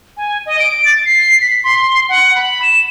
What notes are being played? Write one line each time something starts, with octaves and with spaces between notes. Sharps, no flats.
G#5
D#5
D7
A6
C7
B6
C6
F#5
B5
E7